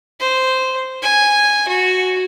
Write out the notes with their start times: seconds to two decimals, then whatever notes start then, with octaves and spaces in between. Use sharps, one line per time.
0.20 C5
1.02 G#5
1.68 F#4